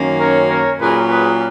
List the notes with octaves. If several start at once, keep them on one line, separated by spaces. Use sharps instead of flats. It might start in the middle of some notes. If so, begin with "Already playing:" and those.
Already playing: F#2 D#3 A#3 C#4
A#4 C#5
A#4 C#5
A#2 F#3 C#4 G#4 B4
G#4 B4